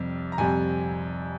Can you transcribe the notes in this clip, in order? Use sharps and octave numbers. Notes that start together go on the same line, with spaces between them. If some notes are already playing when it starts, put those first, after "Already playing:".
Already playing: F2 C3 G3
A#5
F2 C3 G3 G#5